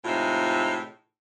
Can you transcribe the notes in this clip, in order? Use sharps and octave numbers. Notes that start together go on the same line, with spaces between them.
A2 C3 E3 G#3 D#4 F4